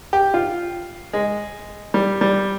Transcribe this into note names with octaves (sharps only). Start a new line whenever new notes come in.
G4
F4
G#3
G3
G3